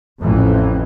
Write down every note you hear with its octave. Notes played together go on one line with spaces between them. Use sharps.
A1 F2 E3